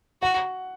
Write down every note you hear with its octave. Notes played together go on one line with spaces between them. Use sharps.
F#4 F#5